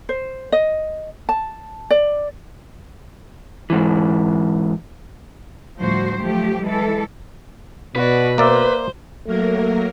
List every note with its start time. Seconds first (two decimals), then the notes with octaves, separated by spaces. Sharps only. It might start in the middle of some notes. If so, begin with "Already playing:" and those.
0.09 C5
0.52 D#5
1.29 A5
1.90 D5
3.70 G#2 E3
5.77 D2 A2 F3 G3 F#4 C5
6.21 F3 F#3 A3 G4
6.63 E3 G#3 A4
7.96 B2 F#4 B4 D5
8.38 A#3 C5 D5 E5
9.26 F#3 A3 A#3 A#4